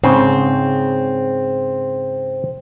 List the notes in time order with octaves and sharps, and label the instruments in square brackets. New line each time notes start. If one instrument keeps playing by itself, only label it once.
[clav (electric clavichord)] G#2 C#3 [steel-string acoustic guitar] C4